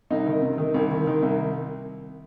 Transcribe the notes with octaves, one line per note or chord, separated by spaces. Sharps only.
C2 D#4
D#3
C3
D#3
C2
D#3
D#3
C2